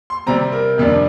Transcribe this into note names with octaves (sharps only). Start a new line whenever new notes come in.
C6
C3 G3 C4 A#5
A#4
F2 C3 G3 D4